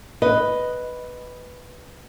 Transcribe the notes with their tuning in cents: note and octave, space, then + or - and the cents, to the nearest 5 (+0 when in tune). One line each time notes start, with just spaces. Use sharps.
B4 +0 D#5 +0